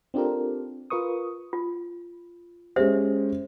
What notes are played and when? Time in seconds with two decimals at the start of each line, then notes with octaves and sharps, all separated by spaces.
0.14 C4 D4 F4 G4 A4 A#4
0.90 F4 A#4 B4 C#6 D#6
1.53 F4
2.76 G#3 C#4 G4 C5 E5